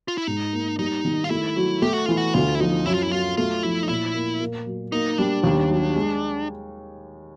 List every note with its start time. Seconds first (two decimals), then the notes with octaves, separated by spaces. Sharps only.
0.08 F4
0.18 E4
0.27 G#2 D#4
0.53 A#3
0.79 G3 D#4
1.05 D#3
1.24 F4
1.30 A3 E4
1.56 F#3
1.82 A3 G4
1.94 F#4
2.06 E3 F4
2.17 F#4
2.34 D2 F4
2.55 E4
2.60 F3 D#4
2.86 F#2 E4
2.94 F4
3.03 E4
3.11 F#3 F4
3.37 A3 F4
3.63 F3 E4
3.83 D#4
3.89 A#2 E4
4.14 A#3
4.40 A#3
4.66 F#3
4.92 A#3 D#4
5.18 G3 D4
5.44 D#2
5.70 F#3
5.96 G#3